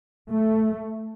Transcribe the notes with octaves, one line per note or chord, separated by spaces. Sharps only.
A3